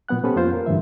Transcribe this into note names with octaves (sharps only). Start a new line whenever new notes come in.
A#2 F#3 B3 F#5 F#6
B3 C#4 G4 A4 B4 C5
F2 A#3 F4 C5
A#4
G2 D3 E3 E5